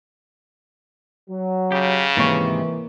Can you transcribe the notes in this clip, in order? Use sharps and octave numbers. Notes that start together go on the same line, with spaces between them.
F#3
C#3 G4
G#2 C3 D#3 E3 A#3 C#5